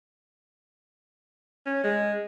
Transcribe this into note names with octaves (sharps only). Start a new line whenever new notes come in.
C#4
G#3